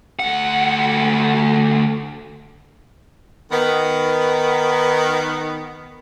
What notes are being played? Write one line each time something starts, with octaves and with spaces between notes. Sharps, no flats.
D2 F#5
D#3 B3